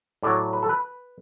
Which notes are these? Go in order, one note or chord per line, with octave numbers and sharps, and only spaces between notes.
A2 F#3 D5
B4
A4
B4